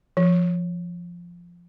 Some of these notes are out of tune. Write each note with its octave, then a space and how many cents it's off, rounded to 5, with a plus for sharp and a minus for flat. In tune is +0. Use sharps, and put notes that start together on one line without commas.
F3 -5